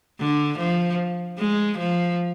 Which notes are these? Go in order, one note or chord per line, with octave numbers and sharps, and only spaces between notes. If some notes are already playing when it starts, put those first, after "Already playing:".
D3
F3
G#3
F3